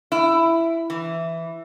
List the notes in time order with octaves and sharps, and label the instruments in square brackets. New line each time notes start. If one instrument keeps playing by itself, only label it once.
[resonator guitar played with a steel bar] E4
E3